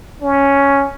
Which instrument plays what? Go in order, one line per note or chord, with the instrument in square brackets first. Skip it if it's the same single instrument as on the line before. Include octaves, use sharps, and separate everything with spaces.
[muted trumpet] C#4